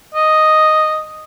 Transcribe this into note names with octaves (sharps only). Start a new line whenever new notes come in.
D#5